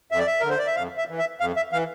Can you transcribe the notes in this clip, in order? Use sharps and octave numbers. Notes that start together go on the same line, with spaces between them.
F2 E5
D5
E5
D3 A#4
C5
D5
E5
F2 F5
E5
E3
E5
F2 F5
E5
E3 F5